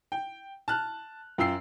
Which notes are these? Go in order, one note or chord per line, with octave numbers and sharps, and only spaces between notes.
G5
A5 F6 F#6
F#2 F4 G5 E6 C7